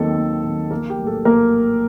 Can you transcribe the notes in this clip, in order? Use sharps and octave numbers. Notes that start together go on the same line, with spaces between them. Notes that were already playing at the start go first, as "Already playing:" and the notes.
Already playing: D#2 D#3 F#3 C4 A4
D#2
D#3 F#3 C4
A#1 A#3 A#4
G4
A2 F#3
A4
A#1 A#3 A#4